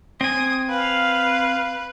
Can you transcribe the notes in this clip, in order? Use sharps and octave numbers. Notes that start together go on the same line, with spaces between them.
C4 G#5 D#6
B4 F5